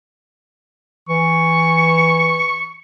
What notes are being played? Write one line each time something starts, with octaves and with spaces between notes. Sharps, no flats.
E3 C#6